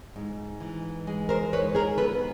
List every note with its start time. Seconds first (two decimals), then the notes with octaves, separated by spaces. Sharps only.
0.16 G#2
0.61 E3
1.07 G#3
1.29 A#4 C5
1.53 G#2 B4 C#5
1.75 G#4 A#4
1.98 B3 A4 B4